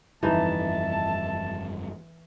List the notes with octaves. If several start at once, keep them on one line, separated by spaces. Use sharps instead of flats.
G1 F2 E3 D#4 D#5 E5 A5